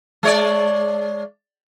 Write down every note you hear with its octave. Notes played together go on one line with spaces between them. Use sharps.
G#3 C#5 D5